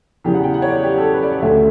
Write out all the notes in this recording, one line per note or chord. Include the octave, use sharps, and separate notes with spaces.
E2 C#3 E3 G4
F#5
G5
F#5
C#5
D5
G4
A4
B4
D5
D5
D2 D3 A3 C#4 E5